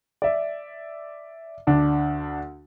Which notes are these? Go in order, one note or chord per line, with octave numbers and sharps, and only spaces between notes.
D5 E5
D2 D4